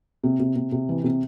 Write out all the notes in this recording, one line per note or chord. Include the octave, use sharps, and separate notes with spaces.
C3
C3
C3
C3
E3
C3